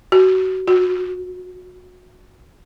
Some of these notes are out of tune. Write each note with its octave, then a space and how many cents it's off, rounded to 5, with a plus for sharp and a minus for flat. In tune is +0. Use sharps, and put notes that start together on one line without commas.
F#4 +25
F#4 -25